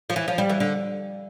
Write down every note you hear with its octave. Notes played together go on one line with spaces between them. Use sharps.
F3
E3
F3
G3
E3
D3